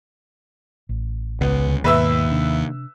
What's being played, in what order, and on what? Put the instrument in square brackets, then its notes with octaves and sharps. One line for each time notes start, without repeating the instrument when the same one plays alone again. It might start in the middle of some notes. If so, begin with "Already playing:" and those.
[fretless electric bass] A1
[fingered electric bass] C#2 [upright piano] B3
[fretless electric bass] D2 D3
[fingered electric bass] D#2 [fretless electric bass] G#2 B2 [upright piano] B4 E5 E6
[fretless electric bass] C3 D4